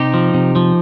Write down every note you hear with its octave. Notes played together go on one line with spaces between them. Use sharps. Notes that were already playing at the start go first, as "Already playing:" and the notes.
Already playing: C3 D#4 G4
F3
C3
F3